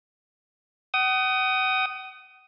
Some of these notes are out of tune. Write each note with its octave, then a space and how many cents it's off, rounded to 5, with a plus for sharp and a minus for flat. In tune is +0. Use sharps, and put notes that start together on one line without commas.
F#5 +40 D#6 +0